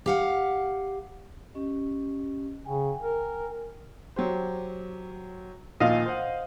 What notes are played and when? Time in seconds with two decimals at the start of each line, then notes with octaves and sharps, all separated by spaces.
0.06 G4 F5 F#5
1.54 C#4 G4 D#5
2.65 C#3 G5 G#5
3.02 A#4
4.16 F#3 G4 C5
5.80 A#2 D#3 F3 D#5 F5
6.06 C5 F#5